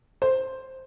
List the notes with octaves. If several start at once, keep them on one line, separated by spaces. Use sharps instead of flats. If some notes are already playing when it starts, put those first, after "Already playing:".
C5